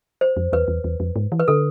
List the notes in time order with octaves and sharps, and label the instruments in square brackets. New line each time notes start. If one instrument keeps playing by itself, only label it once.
[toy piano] C5
[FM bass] F2
[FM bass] E2 [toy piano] B4
[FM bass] E2
E2
F2
G#2
E3
[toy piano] B4
[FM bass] D3 [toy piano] A4